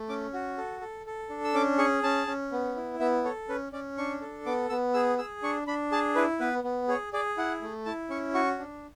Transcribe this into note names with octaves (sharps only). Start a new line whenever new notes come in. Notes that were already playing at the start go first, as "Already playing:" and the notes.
Already playing: A3
C#4 D6
F#4
A4
A4
A4
D4
E6
C#4 D6
G#4 C#6
C#4 A5
C#4
B3
E4
B3 E5
A4 C#5
C#4 B4
C#4 D5
D4 C#6
A4
B3 D6
B3 E6
G#4 E6
G#4 E6
D4 C#6
D4 B5
G#4 A5
E4 B4
B3 B4
B3
G#4 C#5
G#4 D5
E4 F#5
A3
E4 A5
C#4 C#6
F#4 C#6
D4